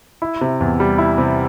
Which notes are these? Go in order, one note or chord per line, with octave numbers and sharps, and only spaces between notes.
E4
C3
E2
G3
E4
C3